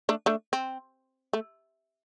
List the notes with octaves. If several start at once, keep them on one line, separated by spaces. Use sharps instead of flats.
A3 D4
A3 D4
C4
A3